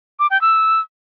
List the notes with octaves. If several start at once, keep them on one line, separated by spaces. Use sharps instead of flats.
D6
G5
E6